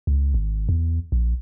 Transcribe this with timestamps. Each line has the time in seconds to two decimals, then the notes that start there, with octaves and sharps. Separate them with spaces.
0.07 C#2
0.34 G#1
0.69 E2
1.12 A#1